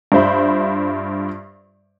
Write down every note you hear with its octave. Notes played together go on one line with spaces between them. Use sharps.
G2 F4 C5 E5 B5